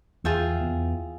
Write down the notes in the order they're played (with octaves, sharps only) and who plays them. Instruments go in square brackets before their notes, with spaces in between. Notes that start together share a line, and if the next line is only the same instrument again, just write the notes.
[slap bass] E2 E3 [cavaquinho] F4 G#4 E5 G5
[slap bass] E2 E3